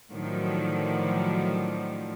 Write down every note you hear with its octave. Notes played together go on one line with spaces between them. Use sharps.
A2 D3 D#3 F3 F#3